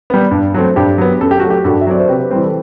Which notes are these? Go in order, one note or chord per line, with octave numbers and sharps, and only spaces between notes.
G3 B3
G2
F#3 A3 C4
G2 G4
F#3 B3
F#2 A4
G4
F#3 A3 F#4
G4
G2 F#4 A4
E5
F#3 C4 D5
C5
C3 G4 B4
E3 G3 C4
A4